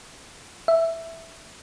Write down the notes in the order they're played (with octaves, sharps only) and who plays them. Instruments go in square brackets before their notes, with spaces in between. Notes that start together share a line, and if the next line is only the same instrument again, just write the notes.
[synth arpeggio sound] E5